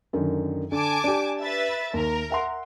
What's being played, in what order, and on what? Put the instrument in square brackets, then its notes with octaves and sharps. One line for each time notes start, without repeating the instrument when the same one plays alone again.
[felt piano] F#2 D3 D#3
[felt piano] D3 [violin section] G#5 A5 D6
[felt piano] D4 G4
[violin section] B4 E5 A6
[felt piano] D#2 [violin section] A#4
[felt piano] E5 F#5 C6